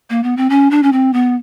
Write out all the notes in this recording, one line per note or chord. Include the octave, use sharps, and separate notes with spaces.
A#3
B3
C4
C#4
D4
C#4
C4
B3